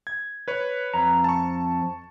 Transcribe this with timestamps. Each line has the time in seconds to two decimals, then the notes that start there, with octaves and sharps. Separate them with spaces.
0.07 G#6
0.48 B4 C#5
0.94 F2 A#5
1.24 A5 C#6